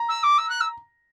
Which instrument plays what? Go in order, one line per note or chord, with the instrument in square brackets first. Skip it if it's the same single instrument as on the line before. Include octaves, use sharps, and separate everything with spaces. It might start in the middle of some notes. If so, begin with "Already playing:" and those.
Already playing: [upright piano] A#5
[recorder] E6
D6
E6
F#6
E6